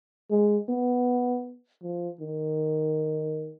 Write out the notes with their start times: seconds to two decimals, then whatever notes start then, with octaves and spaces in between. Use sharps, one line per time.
0.31 G#3
0.69 B3
1.83 F3
2.21 D#3